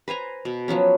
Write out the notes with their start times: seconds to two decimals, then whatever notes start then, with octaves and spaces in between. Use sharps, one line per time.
0.08 B4 C5 G#5 A#5
0.45 B2
0.68 F3 F#3 B3 C#4